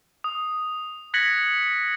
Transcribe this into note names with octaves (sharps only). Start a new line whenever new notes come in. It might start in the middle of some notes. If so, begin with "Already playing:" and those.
D#6
F#6 G#6 A#6 B6 C#7 F#7